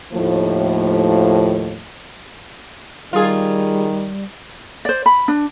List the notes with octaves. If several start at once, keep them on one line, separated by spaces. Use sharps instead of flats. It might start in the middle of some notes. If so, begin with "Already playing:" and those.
D#2 A2 F3
D#3 G3 F4 G#4
C5 D5
B5
D4